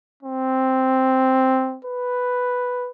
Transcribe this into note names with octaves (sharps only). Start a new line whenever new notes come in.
C4
B4